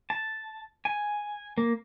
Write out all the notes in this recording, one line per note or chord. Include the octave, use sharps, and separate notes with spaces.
A5
G#5
A#3